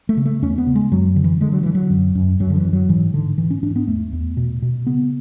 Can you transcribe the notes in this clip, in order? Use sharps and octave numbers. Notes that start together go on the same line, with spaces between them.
A3
C#3
A3
E2 C#4
B3
C#3
G#3
F#2 F#3
D3
E3
D3 G#3
F#3
D3 E3
F#3
F#2
F#2
F#2 F#3
D3
E3
F#2
F#3
G#2 E3
G#2 D3
G#2 E3
C#4
G#2 D4
B3
E2 A3
E2
B2
B2
C#3 B3